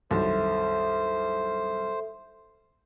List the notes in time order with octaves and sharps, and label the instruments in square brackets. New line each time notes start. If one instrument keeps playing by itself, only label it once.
[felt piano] C2 F#2 D#3 [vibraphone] A4 E5 [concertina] C5